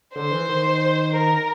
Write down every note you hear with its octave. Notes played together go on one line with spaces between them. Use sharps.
D3 C5
E3
D#3
A#4